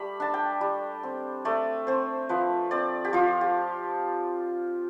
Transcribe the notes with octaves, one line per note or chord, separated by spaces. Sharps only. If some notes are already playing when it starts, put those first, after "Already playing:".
Already playing: G3 A3 B5
D4 A5
G5
G3
C4
A3 D5
C4 C5
F3 B4
C4 D5
G4
F3 F4
G4